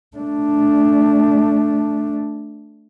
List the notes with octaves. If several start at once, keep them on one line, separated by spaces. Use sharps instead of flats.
A3 D4